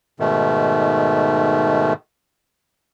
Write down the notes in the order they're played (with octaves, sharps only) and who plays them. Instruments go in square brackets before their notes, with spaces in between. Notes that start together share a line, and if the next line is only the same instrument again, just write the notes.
[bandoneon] G#2 B2 D#3 A3